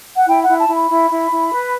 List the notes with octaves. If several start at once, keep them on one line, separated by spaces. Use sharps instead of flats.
F#5
E4 G5
F#5
E4
A5
E4
B5
E4
E4
E4
B4